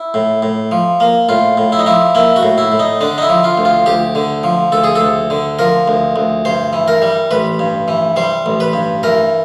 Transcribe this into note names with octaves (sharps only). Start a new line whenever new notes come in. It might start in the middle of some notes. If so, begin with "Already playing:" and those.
Already playing: E4
A2
A2
F3
A#3
A2 F4
A2
E4
D#4
F3 E4
A#3 E4
F#4
A2
E4
A2
D#4
D3 D4
D#4
E4
F3
F4
D2
F4
D2 G4
D3
F3
D2 A4
G#4
A4
D2
D3
F3 A#4
D2
D2
G2 C5
E3
A#4
G3
A1 B4
G2
E3
G3 C5
A1
B4
G2
E3 A#4